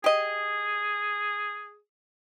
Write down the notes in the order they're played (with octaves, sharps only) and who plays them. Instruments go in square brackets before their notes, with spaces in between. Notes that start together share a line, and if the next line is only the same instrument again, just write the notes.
[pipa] G4 D#5 [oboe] G#4